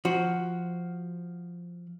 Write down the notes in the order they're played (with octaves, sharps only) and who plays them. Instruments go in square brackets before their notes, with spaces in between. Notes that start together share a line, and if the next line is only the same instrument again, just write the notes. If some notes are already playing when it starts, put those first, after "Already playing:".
[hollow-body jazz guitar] F3 F#4